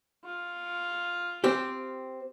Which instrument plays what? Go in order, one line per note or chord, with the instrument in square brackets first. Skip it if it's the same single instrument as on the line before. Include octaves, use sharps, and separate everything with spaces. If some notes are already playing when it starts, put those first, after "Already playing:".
[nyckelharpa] F4
[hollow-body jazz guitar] C4 G4